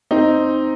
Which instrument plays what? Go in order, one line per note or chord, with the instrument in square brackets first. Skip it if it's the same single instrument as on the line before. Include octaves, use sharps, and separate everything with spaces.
[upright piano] C4 D#4